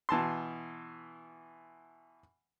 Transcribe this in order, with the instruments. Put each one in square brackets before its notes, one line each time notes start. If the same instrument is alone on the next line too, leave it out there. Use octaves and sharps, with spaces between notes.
[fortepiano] B2 E3 A5 C6